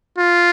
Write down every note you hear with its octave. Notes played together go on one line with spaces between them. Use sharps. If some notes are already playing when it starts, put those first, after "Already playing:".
F4